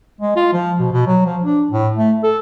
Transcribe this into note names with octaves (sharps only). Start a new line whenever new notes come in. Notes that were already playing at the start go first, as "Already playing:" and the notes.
G#3
F4
F3
B2
B2
F#3
F3
D4
A2
A3
A4